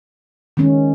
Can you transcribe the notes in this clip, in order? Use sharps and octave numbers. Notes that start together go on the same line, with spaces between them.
D#3 G#3 C#4